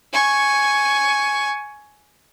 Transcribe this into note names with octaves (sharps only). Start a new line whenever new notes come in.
G#5 C#6